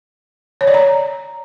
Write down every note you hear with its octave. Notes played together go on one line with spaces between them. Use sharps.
C#5
D5
A#5